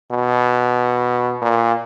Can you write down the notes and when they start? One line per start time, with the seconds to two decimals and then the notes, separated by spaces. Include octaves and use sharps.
0.11 B2
1.42 A#2